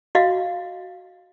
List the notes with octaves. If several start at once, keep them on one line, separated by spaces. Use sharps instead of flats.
F#4 D#5 F5